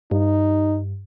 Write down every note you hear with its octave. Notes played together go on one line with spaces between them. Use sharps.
G2 D#4